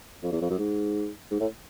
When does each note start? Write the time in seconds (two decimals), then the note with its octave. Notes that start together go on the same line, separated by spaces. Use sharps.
0.23 F2
0.32 E2
0.42 F2
0.50 F#2
0.59 G#2
1.31 G#2
1.40 A2